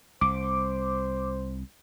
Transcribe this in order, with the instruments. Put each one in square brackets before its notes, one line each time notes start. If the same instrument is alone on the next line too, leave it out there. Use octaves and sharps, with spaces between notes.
[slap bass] C2 [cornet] C5 [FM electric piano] D6